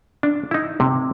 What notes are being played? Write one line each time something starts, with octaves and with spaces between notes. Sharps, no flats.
D4
D#4 E4
C3